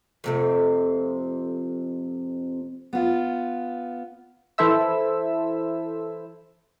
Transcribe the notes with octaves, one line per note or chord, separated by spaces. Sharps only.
F2 C3 A3
B3 F4
E3 E4 A4 C5 E5 E6